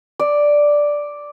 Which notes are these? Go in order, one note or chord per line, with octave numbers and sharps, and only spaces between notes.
D5